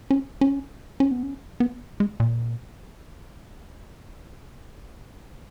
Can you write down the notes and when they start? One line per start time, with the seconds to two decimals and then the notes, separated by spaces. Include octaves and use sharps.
0.11 C#4
0.41 C#4
1.00 C#4
1.11 B3
1.23 C#4
1.60 B3
2.00 G#3
2.20 A#2